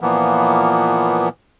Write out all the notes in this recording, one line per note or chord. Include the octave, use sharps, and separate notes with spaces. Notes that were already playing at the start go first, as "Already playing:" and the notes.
A#2 E3 F3 A#3 B3